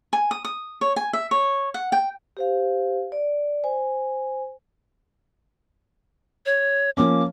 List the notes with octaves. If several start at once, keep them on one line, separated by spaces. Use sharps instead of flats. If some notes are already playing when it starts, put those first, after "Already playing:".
G#5
D#6
D#6
C#5
G#5
E5
C#5
F#5
G5
G4 C5 F5
D5
C5 G#5
C#5
F3 A#3 C#4 D6